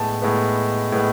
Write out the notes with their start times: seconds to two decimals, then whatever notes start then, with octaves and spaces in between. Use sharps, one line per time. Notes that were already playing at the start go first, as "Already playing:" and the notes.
Already playing: A2 G#3 B3 A5
0.22 A2 G#3 B3
0.92 A2 G#3 B3